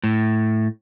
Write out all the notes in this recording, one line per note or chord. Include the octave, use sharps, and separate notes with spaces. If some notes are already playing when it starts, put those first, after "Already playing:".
A2